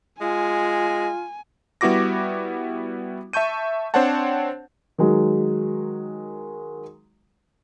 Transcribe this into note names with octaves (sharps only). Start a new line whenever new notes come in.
G#3 F4 G#5
G3 B3 E4 F#4 D6 A#6
E5 A5 C#6 G6 D#7
C4 D4 C5 C#5 F#5 A5
D#3 F#3 G#3